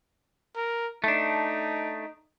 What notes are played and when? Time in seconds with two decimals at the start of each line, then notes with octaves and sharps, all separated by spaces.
0.56 A#4
1.04 A3 D4 D#4